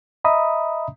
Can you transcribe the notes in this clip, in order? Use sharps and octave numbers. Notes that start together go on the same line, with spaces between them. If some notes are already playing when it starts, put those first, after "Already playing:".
D#5 E5 A#5 B5 D#6